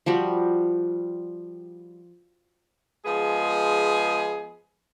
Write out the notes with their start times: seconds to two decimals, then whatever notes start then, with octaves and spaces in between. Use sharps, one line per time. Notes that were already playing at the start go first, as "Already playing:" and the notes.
0.06 F3 G3 F#4
3.04 F3 G#3 B3 G#4